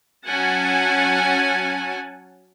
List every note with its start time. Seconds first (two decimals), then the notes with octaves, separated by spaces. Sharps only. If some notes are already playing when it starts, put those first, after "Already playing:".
0.27 F#3 C#4 F#5 G#5 A5